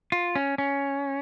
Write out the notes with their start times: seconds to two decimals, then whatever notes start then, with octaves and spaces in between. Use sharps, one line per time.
0.12 F4
0.35 C#4
0.58 C#4